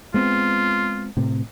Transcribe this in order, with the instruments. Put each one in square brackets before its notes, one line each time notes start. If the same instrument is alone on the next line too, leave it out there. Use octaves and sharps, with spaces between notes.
[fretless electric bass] G#3 B3 C4 [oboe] F4
[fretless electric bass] A2 C3